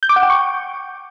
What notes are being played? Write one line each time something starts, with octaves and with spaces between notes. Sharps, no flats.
G6
D6
F#5
G5
C#6